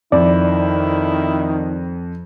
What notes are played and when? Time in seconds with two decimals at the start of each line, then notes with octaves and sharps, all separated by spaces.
0.12 F2 D#3 E4 D5